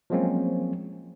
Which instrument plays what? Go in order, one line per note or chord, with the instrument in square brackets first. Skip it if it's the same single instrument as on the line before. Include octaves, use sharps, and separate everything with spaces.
[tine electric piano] F3 F#3 G#3 A#3 C4 C#4